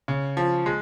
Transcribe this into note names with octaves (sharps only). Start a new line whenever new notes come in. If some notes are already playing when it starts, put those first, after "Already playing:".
C#3
F3
G#3